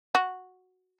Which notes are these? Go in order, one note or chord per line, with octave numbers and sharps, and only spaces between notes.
F#4